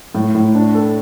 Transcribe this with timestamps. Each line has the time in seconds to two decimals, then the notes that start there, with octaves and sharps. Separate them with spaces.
0.15 A2
0.35 A2
0.55 D4
0.74 A4